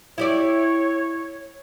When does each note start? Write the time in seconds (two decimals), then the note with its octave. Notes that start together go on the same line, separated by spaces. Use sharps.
0.18 E4 G4 C#5 D5